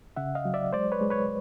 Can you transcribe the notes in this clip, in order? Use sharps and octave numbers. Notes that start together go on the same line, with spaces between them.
C#3 E5 F#5
D#5 F5
F#3
D5 E5
G#3 C5 D5
B4 C#5
G#3
B4 C#5